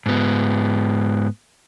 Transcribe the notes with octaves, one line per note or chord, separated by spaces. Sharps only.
G#2 B3